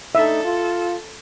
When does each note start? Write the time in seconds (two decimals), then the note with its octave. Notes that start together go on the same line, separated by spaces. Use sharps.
0.15 A3 D4 D#4 A4 E5
0.44 F4